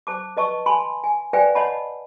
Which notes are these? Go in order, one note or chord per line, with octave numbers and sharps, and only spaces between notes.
C5 A5 D6
B4 D#5 A5 C#6 E6
G#5 A5 B5 C6
G#5
B4 C5 D5 F5 G5 G#5
C#5 D#5 F#5 A5 B5